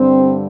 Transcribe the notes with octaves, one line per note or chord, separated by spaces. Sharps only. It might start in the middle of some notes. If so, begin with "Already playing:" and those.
Already playing: G2 D3 G3 C4